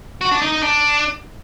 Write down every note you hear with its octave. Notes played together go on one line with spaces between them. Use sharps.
F#4
D4
D#4
D#4
D4